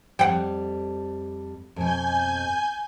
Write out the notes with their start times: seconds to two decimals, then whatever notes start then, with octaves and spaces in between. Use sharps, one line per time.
0.19 F2 G3 F#5 G5
1.76 F2 B2 G#5 G6